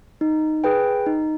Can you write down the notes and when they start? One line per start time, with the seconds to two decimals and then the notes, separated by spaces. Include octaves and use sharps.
0.21 D#4
0.64 G#4 B4 G5
1.06 D#4